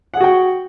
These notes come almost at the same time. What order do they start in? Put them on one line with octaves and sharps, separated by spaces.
F#5 G#4 F#4 G5